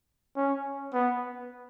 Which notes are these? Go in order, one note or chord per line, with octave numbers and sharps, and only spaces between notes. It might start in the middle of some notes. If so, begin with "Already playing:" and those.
C#4
B3